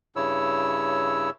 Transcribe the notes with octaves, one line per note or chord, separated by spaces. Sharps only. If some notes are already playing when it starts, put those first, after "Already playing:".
G2 C#3 E4 C#5 E6